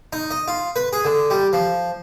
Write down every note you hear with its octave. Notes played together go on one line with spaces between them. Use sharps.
D#4
D#5
F4
B4
G#4
D3
G3
F3